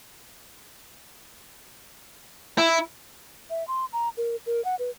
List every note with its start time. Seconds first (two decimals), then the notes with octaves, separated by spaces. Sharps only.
2.58 E4
3.50 E5
3.68 C6
3.93 A#5
4.17 A#4
4.46 A#4
4.65 F#5
4.79 B4